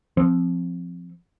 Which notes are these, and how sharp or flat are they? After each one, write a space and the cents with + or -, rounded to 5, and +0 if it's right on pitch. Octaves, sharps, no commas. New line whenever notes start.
F3 +0 C4 +0